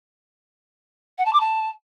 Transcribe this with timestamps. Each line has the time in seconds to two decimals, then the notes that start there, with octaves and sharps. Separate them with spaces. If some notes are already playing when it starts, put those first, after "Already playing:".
1.18 F#5
1.25 A5
1.33 D6
1.40 A5